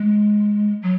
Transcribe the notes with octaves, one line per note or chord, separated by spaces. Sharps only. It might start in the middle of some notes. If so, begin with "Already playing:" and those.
Already playing: G#3
F#3